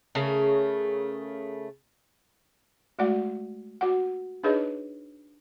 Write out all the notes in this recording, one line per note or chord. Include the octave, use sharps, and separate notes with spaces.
C#3 A3 A#4
G#3 A3 F#4 D5 F#5
F#4 F#5
D4 D#4 G#4 B4 C#5 D#5